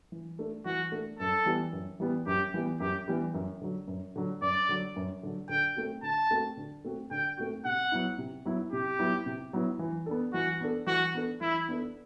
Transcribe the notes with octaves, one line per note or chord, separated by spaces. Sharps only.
E3
A3 D4
E3 F#4
A3 D4
F#2 A4
E3 G3 B3
F#2
E3 G3 B3
F#2 G4
E3 G3 B3
F#2 G4
E3 G3 B3
F#2
D3 F#3
F#2
D3 F#3
F#2 D5
D3 F#3
F#2
D3 F#3
D3 G5
A3 C4 F#4
D3 A5
A3 C4 F#4
D3
A3 C4 F#4
D3 G5
A3 C4 F#4
C3 F#5
F#3 B3 E4
C3
F#3 B3 E4
C3 G4
F#3 B3 E4
C3
F#3 B3 E4
E3
B3 D4 A4
E3 F#4
B3 D4 A4
E3 F#4
B3 D4 A4
E3 E4
B3 D4 A4